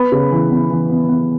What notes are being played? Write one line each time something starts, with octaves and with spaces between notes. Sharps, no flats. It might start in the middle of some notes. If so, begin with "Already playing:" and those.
Already playing: B3 B4 B5
C#3
E3
B3
E3
B3
B3